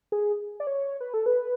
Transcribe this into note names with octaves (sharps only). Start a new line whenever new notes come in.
G#4
D5
C#5
B4
A4
B4